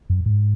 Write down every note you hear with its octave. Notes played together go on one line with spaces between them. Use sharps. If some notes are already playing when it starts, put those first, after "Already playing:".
F#2
G#2